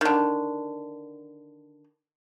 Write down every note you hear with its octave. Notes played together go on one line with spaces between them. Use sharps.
D3 D#3